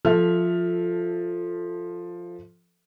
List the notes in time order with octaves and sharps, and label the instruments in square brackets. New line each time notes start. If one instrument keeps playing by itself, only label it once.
[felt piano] F3 A4 E5 F6